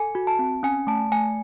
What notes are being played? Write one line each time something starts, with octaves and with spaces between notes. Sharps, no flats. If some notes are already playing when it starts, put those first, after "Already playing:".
Already playing: A4 G#5
F#4
A5
C4
C#4 G#5
A3 A5
A3 G#5